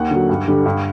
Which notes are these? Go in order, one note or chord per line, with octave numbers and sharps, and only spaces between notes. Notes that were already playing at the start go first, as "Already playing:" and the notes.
Already playing: D#2 F#5
D3 F#3
G2
D3 G3
G2